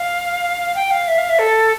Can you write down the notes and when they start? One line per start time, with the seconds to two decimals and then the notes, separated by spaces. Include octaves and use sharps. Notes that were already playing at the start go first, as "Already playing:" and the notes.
Already playing: F5
0.76 G5
0.91 F5
1.08 E5
1.18 F5
1.29 E5
1.39 A4